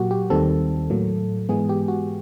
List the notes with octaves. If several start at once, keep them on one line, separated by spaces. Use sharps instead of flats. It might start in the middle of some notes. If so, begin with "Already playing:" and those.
Already playing: A#2 F#3 A#3 F#4 G4
G4
D#2 D#3 G3 C4 A4
A2 F#3 A#3
G#2 E3 G#3 B3 G#4
G4
F#4